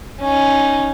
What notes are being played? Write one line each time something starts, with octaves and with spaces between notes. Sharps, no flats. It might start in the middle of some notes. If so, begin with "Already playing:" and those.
C#4 D#4